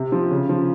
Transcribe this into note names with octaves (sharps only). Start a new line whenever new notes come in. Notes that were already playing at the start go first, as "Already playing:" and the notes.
Already playing: C3
F3
C#3
F3